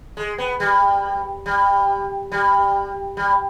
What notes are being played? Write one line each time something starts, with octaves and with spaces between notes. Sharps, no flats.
G#3
B3
G3
G3
G3
G3